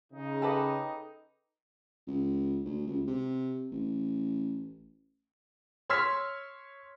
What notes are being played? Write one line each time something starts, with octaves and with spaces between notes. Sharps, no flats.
C#3 D#4
A4 B4 D#5 G5 B5 D6
C#2
D2
C#2
C3
A1
C#5 C6 E6 F6 G#6 B6